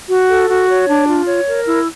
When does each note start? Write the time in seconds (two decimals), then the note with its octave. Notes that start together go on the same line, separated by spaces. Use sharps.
0.08 F#4
0.28 A4
0.48 F#4
0.68 C#5
0.88 D4
1.07 F4
1.27 C#5
1.46 A#4
1.66 E4 E6